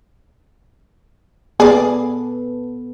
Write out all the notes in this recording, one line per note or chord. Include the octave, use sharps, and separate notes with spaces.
B3 G#4 A4 D5